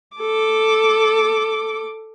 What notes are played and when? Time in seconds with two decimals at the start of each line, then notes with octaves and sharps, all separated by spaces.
0.17 A4 D6